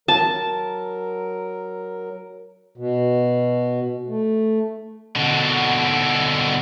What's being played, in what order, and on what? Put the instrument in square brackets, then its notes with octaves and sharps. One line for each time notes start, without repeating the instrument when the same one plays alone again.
[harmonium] F#3 A#4 [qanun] A5
[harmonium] B2
A3
[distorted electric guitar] B2 D3